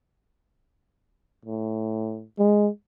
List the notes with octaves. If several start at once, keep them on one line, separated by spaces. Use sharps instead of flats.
A2
G#3